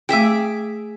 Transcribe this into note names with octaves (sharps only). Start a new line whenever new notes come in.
A3 G#4 E5 G5 D6